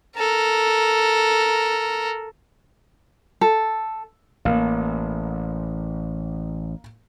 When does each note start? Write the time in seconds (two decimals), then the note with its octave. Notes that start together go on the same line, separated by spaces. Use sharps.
0.17 A4 A#4
3.41 A4
4.45 A1 A#3 F5